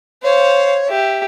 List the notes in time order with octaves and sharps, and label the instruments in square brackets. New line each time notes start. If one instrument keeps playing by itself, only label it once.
[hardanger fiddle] C5 F5 [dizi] C#5
[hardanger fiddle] G4 E5